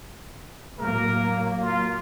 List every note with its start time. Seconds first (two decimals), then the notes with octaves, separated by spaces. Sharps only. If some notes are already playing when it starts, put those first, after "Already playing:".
0.79 A2 F#3 A#3 A#4
1.62 F4